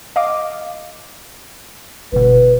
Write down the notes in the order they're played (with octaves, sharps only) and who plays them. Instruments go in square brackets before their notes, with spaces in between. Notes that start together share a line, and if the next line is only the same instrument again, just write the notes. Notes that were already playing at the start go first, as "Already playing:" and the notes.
[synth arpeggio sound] D#5 F5 D6
[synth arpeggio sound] G1 B2 [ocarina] B4